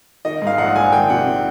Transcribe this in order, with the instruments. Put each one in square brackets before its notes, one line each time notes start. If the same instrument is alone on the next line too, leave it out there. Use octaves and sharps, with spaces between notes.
[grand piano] D#3 D#5
G#2 F5
A#1 F#5
A#1 G#5
D#3 G5
C3 F#5